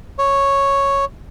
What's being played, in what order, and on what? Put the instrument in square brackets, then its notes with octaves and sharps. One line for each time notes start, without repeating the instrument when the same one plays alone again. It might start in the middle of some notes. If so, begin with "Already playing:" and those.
[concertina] C#5